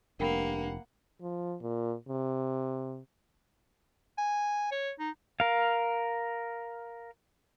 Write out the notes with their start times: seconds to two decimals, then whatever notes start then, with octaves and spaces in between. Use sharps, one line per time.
0.20 F1 G2 A#3 A#4 F#5 G5 B5
1.21 F3
1.61 A#2
2.08 C3
4.18 G#5
4.72 C#5
4.99 D#4
5.40 A#4 F5